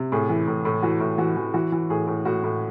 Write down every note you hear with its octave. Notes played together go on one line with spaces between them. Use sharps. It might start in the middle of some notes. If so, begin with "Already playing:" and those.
Already playing: C3
A2 G#4
E3
A2
A2
E3 F#4
A2
E3 F#4
E3
E3 F#4
E3
A2 G#4
A2
A2 F#4
A2